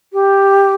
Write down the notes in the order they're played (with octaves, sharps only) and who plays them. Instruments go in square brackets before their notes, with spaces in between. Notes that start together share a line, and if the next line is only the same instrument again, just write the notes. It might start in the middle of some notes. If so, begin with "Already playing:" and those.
[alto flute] G4